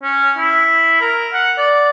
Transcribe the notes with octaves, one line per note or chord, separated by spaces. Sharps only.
C#4
E4
A#4
F#5
D5